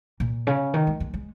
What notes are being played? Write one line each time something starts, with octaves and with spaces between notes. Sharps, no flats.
A#2
C#3
D#3
G#3
G#3
G#3